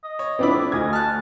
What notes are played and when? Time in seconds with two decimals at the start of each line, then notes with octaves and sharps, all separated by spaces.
0.04 D#5
0.19 C#5
0.39 A2 F3 C4 D4 E4 B5
0.72 D2 D#5 G#6
0.93 A5 F6 F#6